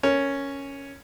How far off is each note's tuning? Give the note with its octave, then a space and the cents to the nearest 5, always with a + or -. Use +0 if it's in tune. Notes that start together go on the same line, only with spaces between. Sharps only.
C#4 +0 A#4 +0